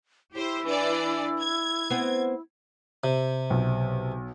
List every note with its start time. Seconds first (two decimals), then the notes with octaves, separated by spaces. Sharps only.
0.33 E4 G4 C5
0.65 E3 D4 D5
1.41 G#6
1.90 B3 C4
3.04 C3
3.50 B1